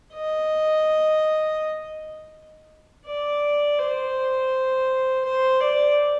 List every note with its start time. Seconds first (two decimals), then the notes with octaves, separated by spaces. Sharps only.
0.14 D#5
3.06 D5
3.79 C5
5.25 C5
5.61 D5